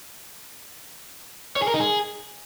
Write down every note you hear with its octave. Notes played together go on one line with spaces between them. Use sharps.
C#5
G#4
A#4
D#4
G#4